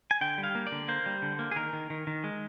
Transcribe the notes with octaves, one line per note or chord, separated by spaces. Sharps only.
G#5
D3 G5
G3
F5
A#3
D5
D3
A#3 C5
G3
D3
A#3
G#4
D#3 A#4
D#3
D#3
D#3
G#3